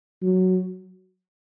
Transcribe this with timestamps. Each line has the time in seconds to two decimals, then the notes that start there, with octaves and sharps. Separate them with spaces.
0.22 F#3